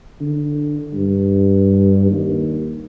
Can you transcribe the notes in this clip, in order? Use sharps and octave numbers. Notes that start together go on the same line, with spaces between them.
D3
G2
D#2